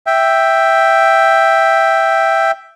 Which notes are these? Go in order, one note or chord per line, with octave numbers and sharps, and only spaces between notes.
E5 G5